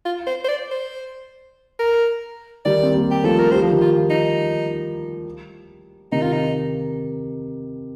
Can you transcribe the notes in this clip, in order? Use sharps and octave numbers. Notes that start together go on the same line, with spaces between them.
F4
C5
C5
D5
C5
A#4
D#3 G3 D5
C4
G3 A#3
G4
F3 A3 A4
A#4
G3 C5
F3
D#3 G3
F4
D#4
C3 D#3 D#4
F4
D#4